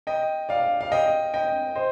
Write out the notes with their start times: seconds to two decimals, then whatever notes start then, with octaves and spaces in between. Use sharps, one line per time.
0.07 D#5 G5
0.49 D5 F5
0.81 F5
0.92 D#5 G5
1.34 D#5 G5
1.76 C5 D#5